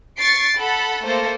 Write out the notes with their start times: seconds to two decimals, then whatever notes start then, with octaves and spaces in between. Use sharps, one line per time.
0.17 C#6 A6 C7 D7
0.57 A4 F#5 A5 B5
1.03 A3 A#3 A4 C5